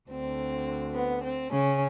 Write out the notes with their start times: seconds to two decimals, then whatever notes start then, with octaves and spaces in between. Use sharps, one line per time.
0.10 D2 D3 C4
0.95 B3
1.23 C4
1.52 C#3 C#4